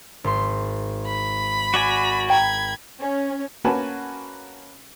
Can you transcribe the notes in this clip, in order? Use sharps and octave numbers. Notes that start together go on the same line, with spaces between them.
G#1 C6
B5
F#4 D5 G#5
G5 A#5 B5 G#6
C#4
A#3 C#4 F#4 B4 G#5 A5